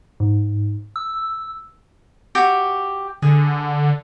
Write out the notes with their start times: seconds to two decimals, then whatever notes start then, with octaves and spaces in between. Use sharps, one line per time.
0.20 G#2
0.96 E6
2.35 F#4 G4 E5
3.22 D3 G#4